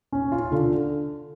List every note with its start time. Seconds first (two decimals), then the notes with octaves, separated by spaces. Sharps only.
0.12 C#4
0.32 F4
0.52 D3